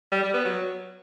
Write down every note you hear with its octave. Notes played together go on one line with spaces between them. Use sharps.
G3
G3
B3
F#3